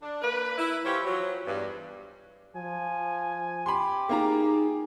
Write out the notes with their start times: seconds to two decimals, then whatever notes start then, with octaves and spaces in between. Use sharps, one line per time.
0.01 D4
0.22 A#3 B4
0.58 E4
0.84 E3 F4 G4 C5 C#5
1.05 F3 F#3
1.45 E2 G2
2.56 F3 G#5
3.66 G4 B5 C6
4.09 A#3 D#4 F4 G#4 A#5